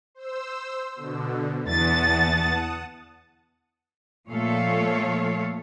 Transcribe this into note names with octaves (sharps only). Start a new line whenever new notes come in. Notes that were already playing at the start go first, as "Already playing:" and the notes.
C5 E6
B2 D3
E2 F#5 A5 D#6 A6
A#2 F3 A3 A4 C#5 F5